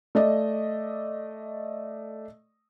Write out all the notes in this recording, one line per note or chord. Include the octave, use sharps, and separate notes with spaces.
A3 D5 D#5